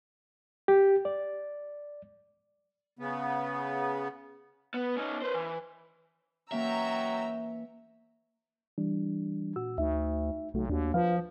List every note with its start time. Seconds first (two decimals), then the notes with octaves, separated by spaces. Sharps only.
0.68 G4
1.05 D5
2.99 C#3 B3
4.74 B3
4.97 C#4 D#4
5.22 B4 C5
5.34 E3
6.52 E3 F#3 A#3 C#4 E5 G5 A#5 E6
8.78 E3 G3 D4
9.56 A#2 F#4 E6
9.78 D2 D#4 E5
10.54 B1 C3 A3 F#4
10.69 D#2 D4 F#4
10.94 F3 F4 B4 F5